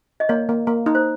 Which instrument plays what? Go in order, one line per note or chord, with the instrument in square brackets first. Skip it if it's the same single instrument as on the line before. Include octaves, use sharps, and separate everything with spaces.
[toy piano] D#5
[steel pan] A#3 [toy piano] C#5
[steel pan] A#3
A#3
D#4
[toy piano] C5